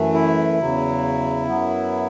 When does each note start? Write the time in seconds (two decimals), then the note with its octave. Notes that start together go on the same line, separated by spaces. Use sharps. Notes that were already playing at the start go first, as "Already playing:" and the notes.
Already playing: F#2 E3 A3
0.14 E4
0.58 E2 C#3 F#3
1.48 F#2 F#3 B3